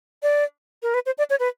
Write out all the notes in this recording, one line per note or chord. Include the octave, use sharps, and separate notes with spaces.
D5
A#4
B4
C5
D5
C#5
B4